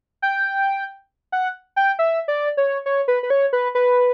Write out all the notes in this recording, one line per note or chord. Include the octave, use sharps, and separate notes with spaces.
G5
F#5
G5
E5
D5
C#5
C#5
B4
B4
C#5
B4
B4